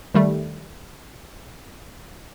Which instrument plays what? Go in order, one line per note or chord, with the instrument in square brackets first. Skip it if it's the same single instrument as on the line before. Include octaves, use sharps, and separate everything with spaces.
[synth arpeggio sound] D#3 G3 A3